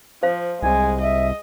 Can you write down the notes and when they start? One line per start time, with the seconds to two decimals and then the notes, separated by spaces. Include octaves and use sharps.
0.23 F3 C5 F5
0.62 C2 G#3 G#5
1.01 D#5 E5